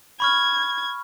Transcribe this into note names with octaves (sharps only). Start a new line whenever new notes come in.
B5 C#6 F6 G#6